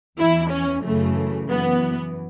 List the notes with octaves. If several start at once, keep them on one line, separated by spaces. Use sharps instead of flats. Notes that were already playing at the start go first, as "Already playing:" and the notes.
E2 E3 E4
C#4
F#2 C#3 E3 A3
F#2 E3 B3